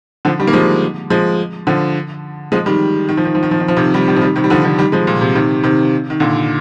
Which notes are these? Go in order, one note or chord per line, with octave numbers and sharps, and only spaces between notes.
D3 F3
D#3 G3
A#3
F3 G#3
F3 G#3
D3 F3
F3 G#3
D#3 G3
D#3
F3
D#3
F3
D#3
F3
D#3
F3
C3 D#3
D#3 G3
D#3 G3
F3
D#3 G3
C3 D#3
G3
D3 F3
D3 F3
D#3 G3
F3 G#3
A#2
C3
C3 D#3
C3 D#3
D#3
A#2 D3